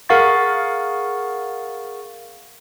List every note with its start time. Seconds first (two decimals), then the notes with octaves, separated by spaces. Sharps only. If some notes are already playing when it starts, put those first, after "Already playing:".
0.09 G#4 A#4 F5 F#5 C#6 A6